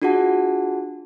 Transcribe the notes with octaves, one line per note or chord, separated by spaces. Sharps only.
D4 F4 F#4 G#4 F#5 A5